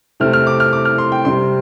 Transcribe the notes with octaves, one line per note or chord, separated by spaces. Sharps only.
C3 A3 C4 F6
F6
D6
F6
D6
F6
C6
G5
C3 G3 C4 C6